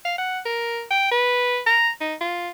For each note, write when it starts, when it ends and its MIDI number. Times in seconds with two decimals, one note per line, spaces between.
0.05 0.14 77
0.18 0.39 78
0.46 0.83 70
0.91 1.08 79
1.11 1.59 71
1.67 1.90 82
2.01 2.14 63
2.21 2.50 65